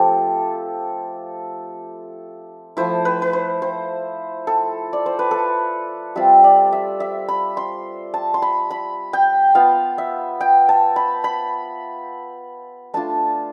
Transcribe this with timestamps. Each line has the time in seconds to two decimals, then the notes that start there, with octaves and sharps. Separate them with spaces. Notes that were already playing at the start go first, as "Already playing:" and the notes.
Already playing: F3 A3 C4 F4 G4 A4
2.77 F3 A3 E4 C5
3.05 B4
3.22 B4
3.33 C5
3.62 C5
4.47 A4
4.93 D5
5.06 C5
5.19 B4
5.31 A4
6.15 G3 C4 F4 E5
6.44 D5
6.73 E5
7.00 E5
7.28 B5
7.57 C6
8.14 A5
8.34 C6
8.42 B5
8.71 B5
9.13 G5
9.55 B3 F4 F5
9.98 E5
10.41 G5
10.69 A5
10.96 B5
11.24 B5
12.94 A3 D4 F4 A5